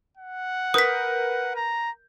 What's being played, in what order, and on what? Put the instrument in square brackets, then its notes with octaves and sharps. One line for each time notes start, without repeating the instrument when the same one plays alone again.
[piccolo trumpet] F#5
[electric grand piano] A#4 B4 G6 [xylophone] D#6 B6
[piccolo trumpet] A#5